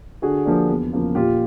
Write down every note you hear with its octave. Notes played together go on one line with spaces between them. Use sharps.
D3 F#4 G#4
F3 A#3 D4
E2
C#3 F3 A#3
A#2 F4 G4